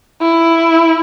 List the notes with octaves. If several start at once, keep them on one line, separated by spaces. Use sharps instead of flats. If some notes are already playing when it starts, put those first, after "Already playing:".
E4